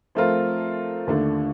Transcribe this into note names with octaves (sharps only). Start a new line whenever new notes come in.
F3 A3 C4 F4 A#4
D#2 D3 A3 D4